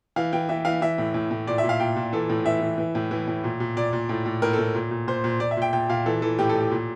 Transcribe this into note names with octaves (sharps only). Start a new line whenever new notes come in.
E3 F5
E3 G5
E3 E5
E3 F5
E3 E5
A2
A2
A2
A#2 D5
E5
A#2
F5
A#2 G5
A#2
E3 A4
A2
E3 E5
E3
E3
A2
E3
A2
A#2
A#2
A#2 D5
A#2
A2
A2
A2 A#4
A4
A2
A#2
A#2
A#2 C5
A#2
A#2 D5
E5
A#2 G5
A#2 G5
A#2 F5
E3 A4
E3 A4
A2 G4
A4
A2
G4
A#2